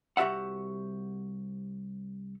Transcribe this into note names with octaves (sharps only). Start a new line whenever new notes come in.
C2 F#4 G4 E5 F#5